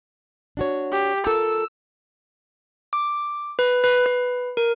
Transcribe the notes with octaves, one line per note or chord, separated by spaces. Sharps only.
D4 F#4 C#5
G4
F4 A4 A#4 E6
D6
B4
B4
B4
A#4